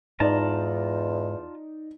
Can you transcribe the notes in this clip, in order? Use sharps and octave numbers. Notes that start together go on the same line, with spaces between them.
E2 G#2 D#4 F4 D5 A5 A#5